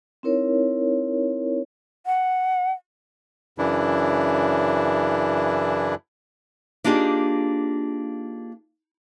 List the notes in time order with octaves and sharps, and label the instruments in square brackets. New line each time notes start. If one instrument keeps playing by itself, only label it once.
[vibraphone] C4 D#4 E4 A#4 C#5
[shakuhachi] F#5
[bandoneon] F#2 C#3 E3 D4 E4
[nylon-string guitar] A#3 D4 D#4 F4 G4 G#4